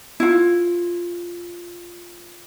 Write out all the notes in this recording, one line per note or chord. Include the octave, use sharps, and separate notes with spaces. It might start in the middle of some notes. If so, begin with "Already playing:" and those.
E4 F4